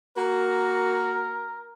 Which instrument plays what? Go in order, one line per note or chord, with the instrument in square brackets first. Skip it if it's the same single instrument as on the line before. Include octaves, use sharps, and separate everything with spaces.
[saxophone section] A#3 F#4 [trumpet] A#4